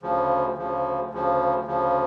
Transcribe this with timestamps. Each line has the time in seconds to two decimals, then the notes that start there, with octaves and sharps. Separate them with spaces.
0.02 D2 C#3 F3
0.56 D2 C#3 F3
1.11 D2 C#3 F3
1.66 D2 C#3 F3